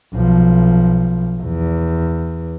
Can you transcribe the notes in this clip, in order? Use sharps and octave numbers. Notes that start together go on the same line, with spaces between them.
B1 F3
E2